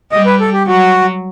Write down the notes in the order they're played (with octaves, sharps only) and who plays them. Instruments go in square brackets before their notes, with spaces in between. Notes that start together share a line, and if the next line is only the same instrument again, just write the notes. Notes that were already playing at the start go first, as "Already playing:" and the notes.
[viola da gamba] G3 [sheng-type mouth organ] D#5
[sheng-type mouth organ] B4
A4
G4
[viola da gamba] F#3 [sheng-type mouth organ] F#4